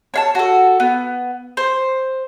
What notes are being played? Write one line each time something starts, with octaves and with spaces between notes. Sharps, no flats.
C#5 F5 A5
F#4 A4
B3
C5